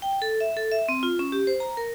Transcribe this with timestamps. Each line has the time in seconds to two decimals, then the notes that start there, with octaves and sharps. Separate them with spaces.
0.02 G5
0.22 A4
0.40 E5
0.57 A4
0.72 E5
0.89 C4
1.03 F4
1.19 C#4
1.32 G4
1.47 C5
1.60 A#5
1.77 A#4